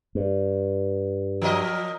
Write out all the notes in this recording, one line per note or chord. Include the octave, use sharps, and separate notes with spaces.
G2
F3 A#4 D#5